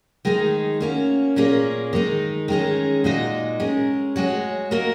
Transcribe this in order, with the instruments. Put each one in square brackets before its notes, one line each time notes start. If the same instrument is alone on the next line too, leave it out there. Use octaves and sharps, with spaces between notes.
[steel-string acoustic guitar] D#3 G#3 D#4 G#4
A#3 C#4 F#4
A#2 A#3 C#4 G#4
D#3 G#3 D#4
D#3 G#3 C#4 G#4
A#2 G#3 D#4 F#4 D#5
G#3 C#4 A#4
G#3 F#4 C#5
A#3 F#4 A#4 D#5